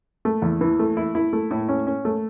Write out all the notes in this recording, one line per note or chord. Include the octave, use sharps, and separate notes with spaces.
A3
E2
E3
A3
E4
E4
A3
A2
C#4
C#4
A3